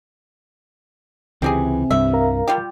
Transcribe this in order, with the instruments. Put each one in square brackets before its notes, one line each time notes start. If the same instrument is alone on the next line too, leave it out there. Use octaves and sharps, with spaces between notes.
[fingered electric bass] C#2 E3 [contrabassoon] C3 [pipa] C4 G4 G#4
[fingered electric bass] C2 G2 [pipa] E5
[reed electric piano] A#4 F5 A#5
[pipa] G3 F4 G4